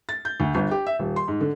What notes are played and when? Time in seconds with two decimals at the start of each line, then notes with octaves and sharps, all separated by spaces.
0.09 A6
0.25 G6
0.40 D2
0.55 G1
0.71 G4
0.86 E5
0.99 D#1
1.16 C6
1.28 G#2
1.41 D3